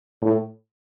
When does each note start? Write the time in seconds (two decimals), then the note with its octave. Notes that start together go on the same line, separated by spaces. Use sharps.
0.22 A2